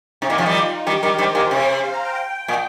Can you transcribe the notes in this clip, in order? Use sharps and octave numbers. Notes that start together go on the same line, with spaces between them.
C3 D#4
A#2 D#3
C3 F3
D#3 G3
F4
D#3 G3 G4
D#3 G3 A#4
D#3 G3 C5
A#2 D#3
C3
F5
A#5
G5
G5
A#2